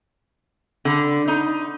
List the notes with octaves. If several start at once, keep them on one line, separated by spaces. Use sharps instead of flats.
D3
D#4